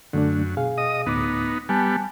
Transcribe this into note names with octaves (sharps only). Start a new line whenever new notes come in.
F#2 D3 A3 D4
B2 G#4 F5
D#5 D#6
D2 A2 B3 D#4 D6
G3 B3 G#5 A5